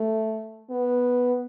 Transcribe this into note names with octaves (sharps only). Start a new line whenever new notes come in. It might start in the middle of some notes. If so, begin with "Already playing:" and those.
Already playing: A3
B3